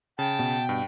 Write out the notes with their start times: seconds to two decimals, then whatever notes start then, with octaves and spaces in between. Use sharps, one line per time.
0.19 C#3 G5 A5
0.39 B2
0.69 G2